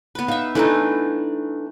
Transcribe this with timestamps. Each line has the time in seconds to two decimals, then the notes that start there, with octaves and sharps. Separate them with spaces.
0.15 B3 B4
0.28 D#4 E5 F5
0.55 E3 A3 D4 D#4 A4 B4